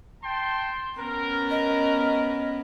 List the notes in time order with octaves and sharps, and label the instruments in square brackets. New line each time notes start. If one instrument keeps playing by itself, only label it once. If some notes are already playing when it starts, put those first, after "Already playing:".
[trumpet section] G5 A5 C6
[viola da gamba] B3 C#4 [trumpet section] A#4
[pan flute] D#5